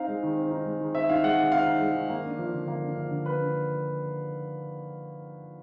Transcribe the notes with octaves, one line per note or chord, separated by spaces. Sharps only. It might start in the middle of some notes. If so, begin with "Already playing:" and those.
Already playing: C4 D#4 F5
G#3
D#3
C4
D#4
G#3
D#3
C4 E5
D#4 F5
G#3 F#5
D#3
C4 F5
D#4
G#3
D#3
A#3
D4
F3
D3
A#3
D4
F3
D3
A#3 B4
D4